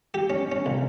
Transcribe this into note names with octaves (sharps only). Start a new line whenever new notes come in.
G4
C#4
C#4
C2